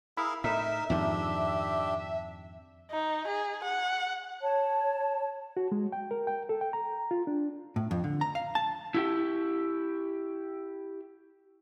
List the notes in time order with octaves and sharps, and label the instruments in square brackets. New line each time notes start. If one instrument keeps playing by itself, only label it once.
[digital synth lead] E4 [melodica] G#4 A#4 F5
[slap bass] A2 [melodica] D#4 A#4 [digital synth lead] E5
[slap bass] F2 G#2 D#3 [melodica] D4 G4
[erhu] D#4
G#4
F#5
[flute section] C#5 A5
[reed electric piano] F#4
G#3
G5
A#4
G5
A4
G5
A#5
F4
D4
[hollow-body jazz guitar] A2
F2
D3
A#5
F5
A5
[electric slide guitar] E4 G4